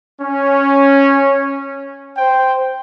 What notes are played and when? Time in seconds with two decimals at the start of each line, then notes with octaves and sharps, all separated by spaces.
0.21 C#4
2.17 C5 G5